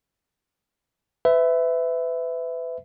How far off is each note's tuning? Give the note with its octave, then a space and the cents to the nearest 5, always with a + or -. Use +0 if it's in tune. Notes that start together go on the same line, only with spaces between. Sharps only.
B4 +30 E5 +0